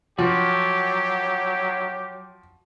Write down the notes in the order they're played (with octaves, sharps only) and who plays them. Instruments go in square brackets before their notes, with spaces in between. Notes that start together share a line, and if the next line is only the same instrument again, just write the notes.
[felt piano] F3 [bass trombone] F#3 [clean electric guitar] F#4 [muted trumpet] G4